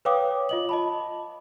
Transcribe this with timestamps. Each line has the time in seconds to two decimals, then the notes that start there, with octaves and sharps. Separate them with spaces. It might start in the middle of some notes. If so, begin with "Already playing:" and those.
0.05 B4 C#5 F5 G5 D6 D#6
0.49 F4 D#5 F#7
0.69 D#5 A5 B5